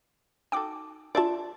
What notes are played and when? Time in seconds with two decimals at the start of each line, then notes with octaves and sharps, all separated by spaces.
0.52 D#4 F#4 A4 G5 D6
1.15 D4 F4 D5 E5 A5